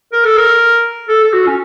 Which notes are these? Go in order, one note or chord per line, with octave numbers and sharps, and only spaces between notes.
A#4
A4
A#4
A4
A4
F#4
C#4